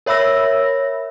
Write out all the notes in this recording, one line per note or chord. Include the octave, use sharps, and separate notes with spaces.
A#4 C#5 E5 B5 E6 A#6